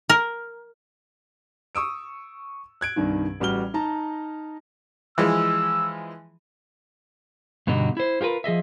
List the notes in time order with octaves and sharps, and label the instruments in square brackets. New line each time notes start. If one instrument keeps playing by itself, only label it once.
[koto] A#4
[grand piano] C#6 D#6 E6 D7
F#6 G#6 D7
C2 G2 D#3
A1 G3 F#4 F6 G7
D#4 A5 A#5
[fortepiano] E3 F3 G#3 [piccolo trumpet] E6
[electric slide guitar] G2 B2 D3 D#4 F#4 G4
E4 C5
F4 G4 A#4 B4
F3 G#4 D#5 E5